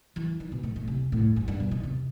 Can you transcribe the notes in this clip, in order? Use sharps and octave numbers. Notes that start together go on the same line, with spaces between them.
E3
D#3
B2
A2
A2
C3
A2
G2
G2
B2
D#3
C3